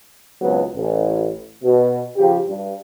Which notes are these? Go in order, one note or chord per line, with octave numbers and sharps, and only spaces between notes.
G#1 C#2 F#3 B3
A1
B2
C#3 F3 G4
G2